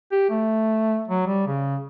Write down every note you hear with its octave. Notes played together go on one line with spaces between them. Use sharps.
G4
A3
F#3
G3
C#3